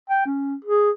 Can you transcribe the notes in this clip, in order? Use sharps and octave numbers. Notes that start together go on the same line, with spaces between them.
G5
C#4
G#4